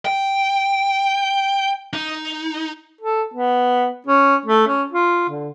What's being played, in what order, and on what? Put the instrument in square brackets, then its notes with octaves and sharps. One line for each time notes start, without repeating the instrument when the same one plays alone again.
[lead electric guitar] G5
D#4
[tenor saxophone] A4
B3
C#4
A3
C#4
F4
D3